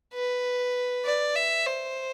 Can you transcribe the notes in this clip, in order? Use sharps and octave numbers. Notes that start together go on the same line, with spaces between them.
B4
D5
E5
C5